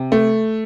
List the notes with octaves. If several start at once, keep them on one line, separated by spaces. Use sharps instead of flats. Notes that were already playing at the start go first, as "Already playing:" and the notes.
Already playing: C3
A3